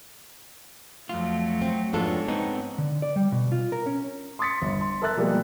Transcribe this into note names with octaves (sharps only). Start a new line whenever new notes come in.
F2 F#3 A3 F4
C4
F2 G#2 G#3 B3 D4 F4 A4 C#5
B3 C4 D#4
D3
D5
G3
B2
F4
A#4
C#4
C6 D6 D#6 A6 B6 C#7
G1
C6
A4 A#4 E5 E6 F#6 A6
B2 F3 G3 G#3 A#3